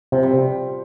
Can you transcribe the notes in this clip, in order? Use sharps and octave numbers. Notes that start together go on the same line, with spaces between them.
C3 F3
G3